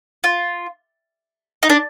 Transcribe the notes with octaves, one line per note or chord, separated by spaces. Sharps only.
F4
D#4
D4